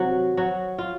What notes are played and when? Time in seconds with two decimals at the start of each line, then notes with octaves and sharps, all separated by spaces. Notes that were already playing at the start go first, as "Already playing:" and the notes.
Already playing: C3 D#3 F#3 F#4
0.37 F#3 F#4
0.78 F4